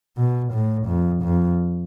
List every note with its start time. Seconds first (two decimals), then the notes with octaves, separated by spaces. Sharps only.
0.18 B2
0.53 A2
0.87 F2
1.23 F2